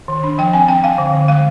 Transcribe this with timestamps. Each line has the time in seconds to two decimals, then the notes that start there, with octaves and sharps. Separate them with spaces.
0.08 D#3
0.23 D4
0.38 F3 G5
0.53 C4 G#5
0.68 C4 G5
0.84 C4 F5
0.98 D3
1.13 D3
1.28 G#3 F5